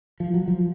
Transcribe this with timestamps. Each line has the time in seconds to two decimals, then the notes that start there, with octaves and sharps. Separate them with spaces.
0.20 F3
0.34 F#3
0.48 F3